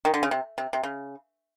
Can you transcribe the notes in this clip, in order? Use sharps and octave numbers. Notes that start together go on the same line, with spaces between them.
D#3
D3
C#3
C3
C3
C3
C#3